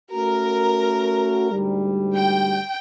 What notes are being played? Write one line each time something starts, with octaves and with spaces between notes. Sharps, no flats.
A3 C#4 F#4 A#4
D2 G#2 G3
G5